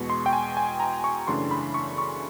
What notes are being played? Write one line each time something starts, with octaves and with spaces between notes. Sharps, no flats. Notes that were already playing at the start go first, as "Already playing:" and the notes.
Already playing: E2 B2 G#3 B3 C#6
C6
G5
G#5
G#5
A#5
C#6
F#2 C#3 E3 A3 D4 C6
B5
C#6
C#6